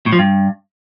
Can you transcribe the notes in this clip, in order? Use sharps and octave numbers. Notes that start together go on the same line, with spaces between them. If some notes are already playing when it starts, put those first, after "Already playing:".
A2
F3
G2